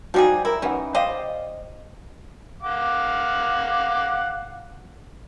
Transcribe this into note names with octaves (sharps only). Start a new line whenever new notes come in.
F3 G3 D#4 F#4 G#4
E4 A#4
E3 B3 C#4 D#4 F#5
G4 C5 D5 D#5 F5
F5 F#5 D6